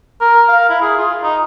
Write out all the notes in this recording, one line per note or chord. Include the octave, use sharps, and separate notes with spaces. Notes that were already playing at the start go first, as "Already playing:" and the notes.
A#4
F5
E4
G#4
F4
D#4